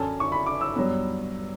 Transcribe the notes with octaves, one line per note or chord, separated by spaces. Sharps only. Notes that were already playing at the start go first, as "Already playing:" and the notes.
Already playing: F#2 D3 F#3 C#4 A5
C#6
B5
D6
E6
G2 F#3 B3